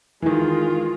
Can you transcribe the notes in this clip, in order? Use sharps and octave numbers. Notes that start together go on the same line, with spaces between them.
D#3 E3 G#3 F4